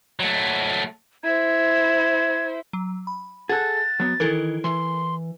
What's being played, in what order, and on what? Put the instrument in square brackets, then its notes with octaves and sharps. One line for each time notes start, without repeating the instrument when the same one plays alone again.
[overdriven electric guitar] F#3 A3
[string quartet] E4 C5 [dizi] G#6
[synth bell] F#3
B5
[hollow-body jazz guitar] G#4 A4 [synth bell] F#5 F#6 [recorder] A6
[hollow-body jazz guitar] F#3 B3
[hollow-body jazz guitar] D#3 E3 [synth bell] E4 A4 A#4
[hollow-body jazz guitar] E3 [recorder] C6